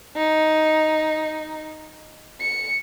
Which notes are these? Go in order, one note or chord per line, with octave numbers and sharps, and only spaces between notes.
D#4
C#7